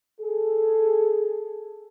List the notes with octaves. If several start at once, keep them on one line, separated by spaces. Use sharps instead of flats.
G#4 A4